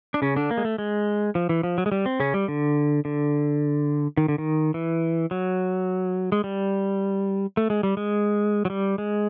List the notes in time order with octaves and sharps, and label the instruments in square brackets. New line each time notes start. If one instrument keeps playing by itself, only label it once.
[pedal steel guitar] D4
C#3 C#4
D3 D4
A#3
G#3
A3
G#3
F3
E3
F3
F#3
G#3
G3
C4
C#3 C#4
G3
D3
D3
D#3
D3
D#3
E3
F#3
G#3
G3
A3
G#3
G3
G#3
F#3
G3
G#3